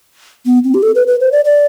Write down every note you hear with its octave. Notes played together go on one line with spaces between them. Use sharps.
B3
C4
G4
A4
B4
B4
C5
D5
D5